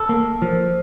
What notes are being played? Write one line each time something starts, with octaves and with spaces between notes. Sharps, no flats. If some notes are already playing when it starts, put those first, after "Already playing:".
Already playing: A4
A#3
F3